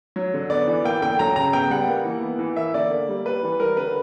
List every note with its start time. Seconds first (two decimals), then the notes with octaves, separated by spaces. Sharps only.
0.16 F#3
0.34 D3
0.50 B3 D5
0.68 E3
0.84 A#3 G5
1.01 D3 G5
1.19 F#3 A#5
1.36 C#3 A#5
1.53 B3 G5
1.70 G3 F#5
1.88 A#3
2.05 E3
2.22 B3
2.39 E3
2.56 A#3 E5
2.74 D3 D5
2.90 A#3
3.09 G3
3.26 G3 B4
3.43 E3
3.59 G3 A#4
3.77 D3 B4